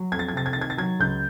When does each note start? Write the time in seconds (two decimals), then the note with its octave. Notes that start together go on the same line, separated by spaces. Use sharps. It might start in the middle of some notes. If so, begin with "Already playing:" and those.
Already playing: F#3
0.12 F2 G#6
0.19 A6
0.28 G#6
0.33 C3 A6
0.46 G#6
0.53 D#3 A6
0.61 G#6
0.70 A6
0.78 F#3 G#6
1.00 C#2 G6